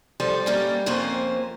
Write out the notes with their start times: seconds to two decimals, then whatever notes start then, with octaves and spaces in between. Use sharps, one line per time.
0.20 F3 G3 A4
0.46 G3 A#3 C#4
0.86 F2 F3 A#3 C#4 C5